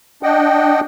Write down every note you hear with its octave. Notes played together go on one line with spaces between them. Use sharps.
D4 D#5 F#5 G5